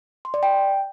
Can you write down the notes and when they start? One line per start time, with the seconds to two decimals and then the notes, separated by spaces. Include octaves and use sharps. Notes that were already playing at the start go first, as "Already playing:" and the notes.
0.25 C6
0.34 D5
0.43 G5